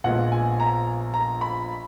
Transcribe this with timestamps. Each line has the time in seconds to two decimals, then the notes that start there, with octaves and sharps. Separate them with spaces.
0.04 A#1 A#2 G#3 B3 F#5
0.32 G#5
0.60 A#5
1.14 A#5
1.41 B5